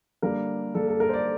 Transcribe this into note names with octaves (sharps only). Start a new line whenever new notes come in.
D3 G3 A#3 D4 A#4
D3 G3 A#3 D4 A4
A4
A#4
C5
D5